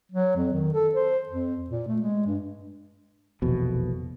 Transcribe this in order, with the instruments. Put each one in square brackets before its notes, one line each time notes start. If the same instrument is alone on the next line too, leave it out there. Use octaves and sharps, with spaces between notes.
[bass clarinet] F#3
F2
D#3
A4
C5
F2
A#2
A3
G#3
G2
[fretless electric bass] F1 A#1 E2 B2